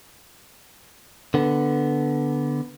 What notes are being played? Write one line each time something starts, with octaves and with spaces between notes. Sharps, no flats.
D3 B3